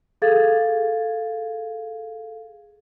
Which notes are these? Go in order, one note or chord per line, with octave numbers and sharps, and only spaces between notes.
G#4 A4 F5 G#6 A6